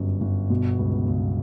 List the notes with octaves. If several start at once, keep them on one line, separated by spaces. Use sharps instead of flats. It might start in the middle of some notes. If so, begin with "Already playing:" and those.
Already playing: G1 F#2
G1
B2
C#2
C#2